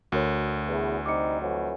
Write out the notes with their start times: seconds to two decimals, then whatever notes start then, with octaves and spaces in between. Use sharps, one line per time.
0.12 D2 F#4 A#4 C#5
0.68 E2
1.06 C3 G3 D#4 D6 C#7
1.40 F2 E3 F#3